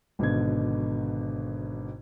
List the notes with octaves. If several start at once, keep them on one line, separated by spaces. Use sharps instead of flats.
G#1 B2 D3 G#6